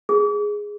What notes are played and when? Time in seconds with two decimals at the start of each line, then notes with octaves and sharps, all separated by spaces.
0.09 G#4